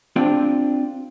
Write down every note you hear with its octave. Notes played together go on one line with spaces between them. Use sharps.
C4 D4 F4 G4